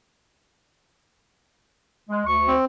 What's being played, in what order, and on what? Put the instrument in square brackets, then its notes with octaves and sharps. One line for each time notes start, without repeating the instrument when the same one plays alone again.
[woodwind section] G#3
D2 C#6
[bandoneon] C4